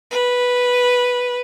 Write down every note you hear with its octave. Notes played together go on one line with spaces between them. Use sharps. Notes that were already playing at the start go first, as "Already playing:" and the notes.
B4